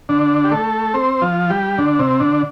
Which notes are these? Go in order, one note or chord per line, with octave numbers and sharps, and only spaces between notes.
D3 D4
G4
A3 A4
C4 C5
F3 F4
G3 G4
D3 D4
C3 C4
D3 D4